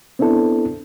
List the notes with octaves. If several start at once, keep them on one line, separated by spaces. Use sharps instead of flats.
B3 C4 D4 E4 A4